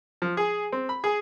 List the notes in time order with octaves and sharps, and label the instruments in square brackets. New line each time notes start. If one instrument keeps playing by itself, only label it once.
[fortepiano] F3
G#4
C4
B5
G#4